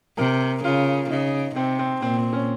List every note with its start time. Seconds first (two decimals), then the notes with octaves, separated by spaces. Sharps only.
0.18 C3 A#4
0.64 C#3 F4
1.10 C#3 D#4
1.56 C3 C4
1.79 C4
2.02 A#2 C4
2.17 C4
2.33 C#4